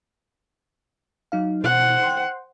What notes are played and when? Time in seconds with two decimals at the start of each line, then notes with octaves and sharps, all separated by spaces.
1.32 F#3 D#4 F5
1.64 B2 C5 F#5
2.03 G5 C6